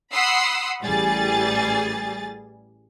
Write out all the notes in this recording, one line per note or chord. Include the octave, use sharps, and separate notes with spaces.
F#5 B5 C6 D#6 E6 C7
A1 G3 G#4 A6